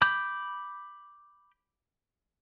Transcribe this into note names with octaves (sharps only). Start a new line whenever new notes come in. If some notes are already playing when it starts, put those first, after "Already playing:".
B5 D6 G6